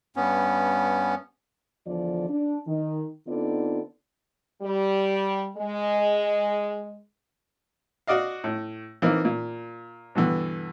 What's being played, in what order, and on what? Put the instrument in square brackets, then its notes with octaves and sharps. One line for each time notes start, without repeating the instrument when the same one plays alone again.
[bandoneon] G2 B3 C#4
[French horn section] E2 D3 F3 D5
D4
D#3
D3 B3 C4 D#4 F4 D5
G3
G#3
[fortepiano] F#4 D5 D#5 F5
A2
E3 A#3 C4 D#4 F4
A#2
G2 B2 D3 E3